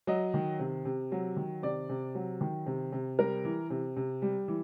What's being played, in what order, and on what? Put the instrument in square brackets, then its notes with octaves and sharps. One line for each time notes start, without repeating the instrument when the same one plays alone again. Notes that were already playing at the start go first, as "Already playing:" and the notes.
[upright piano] F#3 D#5
D#3
C3
C3
F#3
D#3
C3 D5
C3
F#3
D#3
C3
C3
G3 A#4
E3
C3
C3
G3
E3